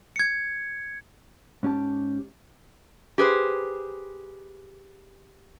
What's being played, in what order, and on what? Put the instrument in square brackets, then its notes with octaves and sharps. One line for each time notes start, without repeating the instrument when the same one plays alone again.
[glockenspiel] G#6 C#7
[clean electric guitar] G#2 C#4 G4 A5
[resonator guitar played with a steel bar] G4 G#4 B4 C5